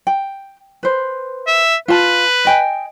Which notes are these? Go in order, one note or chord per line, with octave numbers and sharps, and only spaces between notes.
G5
B4 C5
E5
F4 B4 A5
D#5 G5 G#5